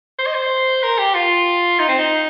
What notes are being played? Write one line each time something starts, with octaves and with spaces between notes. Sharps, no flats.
C5
D#5
C5
A#4
G4
F4
D#4
C4
D#4